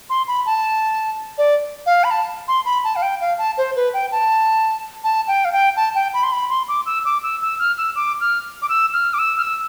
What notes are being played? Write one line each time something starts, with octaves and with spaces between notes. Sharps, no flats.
C6
B5
A5
D5
F5
B5
A5
C6
B5
A5
F5
G5
F5
A5
C5
B4
G5
A5
A5
G5
F5
G5
A5
G5
B5
C6
B5
C6
D6
E6
D6
E6
E6
F6
E6
D6
F6
D6
E6
F6
D6
E6
F6
E6